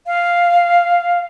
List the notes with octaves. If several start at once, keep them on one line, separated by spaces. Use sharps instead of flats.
F5